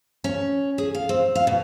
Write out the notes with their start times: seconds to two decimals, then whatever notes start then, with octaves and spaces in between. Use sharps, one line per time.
0.24 C#4
0.78 G#4
0.95 F5
1.09 C4
1.35 F5
1.47 B2